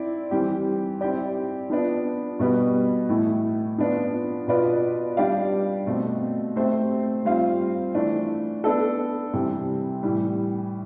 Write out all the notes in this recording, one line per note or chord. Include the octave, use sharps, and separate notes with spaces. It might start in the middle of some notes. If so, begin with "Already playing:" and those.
Already playing: C4 E4 D5
E3 G3 C4 G4
C4 E4 G4 D5
F3 B3 D4
B2 G3 B3
A2 E3 A3 E4
F3 B3 D4 F4
B2 B3 F4 B4 D5
G3 D4 G4 D5 F5
B2 A3 C4
A3 C4 G4 C5 E5
G3 C4 F4 C5 F5
E3 A3 D4
B3 D4 A4
C3 E3 G3 C4
A2 E3 G3